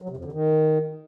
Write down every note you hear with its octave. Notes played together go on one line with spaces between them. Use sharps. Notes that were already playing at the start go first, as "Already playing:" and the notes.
F#3
C3
F2
D3
D#3